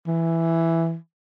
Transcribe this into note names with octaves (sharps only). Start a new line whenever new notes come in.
E3